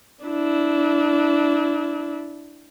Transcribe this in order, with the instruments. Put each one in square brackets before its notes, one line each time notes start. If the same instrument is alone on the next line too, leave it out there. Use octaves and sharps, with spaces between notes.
[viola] D4 E4